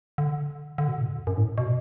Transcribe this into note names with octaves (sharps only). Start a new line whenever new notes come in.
D3
D3
B2
A2
F#2
E2
F#2
A2
B2